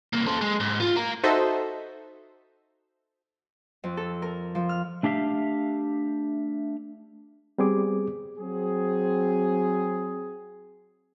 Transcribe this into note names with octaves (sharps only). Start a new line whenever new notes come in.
C2 A#3
A4 C5
G#3
G#2
F4
F5 A#5
D#4 F#4 A4 C5 D#5 E5
F2
A4
A#4
F3
F6
A3 D4 G4 E5 F5
G3 B3 C4 G#4 G#5 D6
F#3 C4 G#4